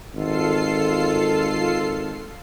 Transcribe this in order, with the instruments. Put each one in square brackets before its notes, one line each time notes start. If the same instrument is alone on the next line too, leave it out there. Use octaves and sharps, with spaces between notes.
[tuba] G#1 [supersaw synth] F4 A4 C7